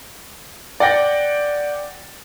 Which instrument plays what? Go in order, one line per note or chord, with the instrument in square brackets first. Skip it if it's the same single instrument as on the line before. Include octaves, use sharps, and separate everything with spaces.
[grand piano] D5 F#5 G5 A#6